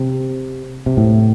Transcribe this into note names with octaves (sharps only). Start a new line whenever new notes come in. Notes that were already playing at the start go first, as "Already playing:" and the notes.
Already playing: C3
C3
A2